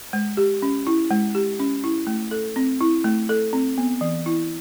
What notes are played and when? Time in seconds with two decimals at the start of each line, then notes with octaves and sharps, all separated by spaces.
0.13 G#3
0.37 G4
0.62 C#4
0.87 E4
1.11 G#3
1.35 G4
1.60 C#4
1.84 E4
2.07 A3
2.31 A4
2.56 C4
2.81 E4
3.04 A3
3.29 A4
3.53 C4
3.78 B3
4.01 E3
4.26 E4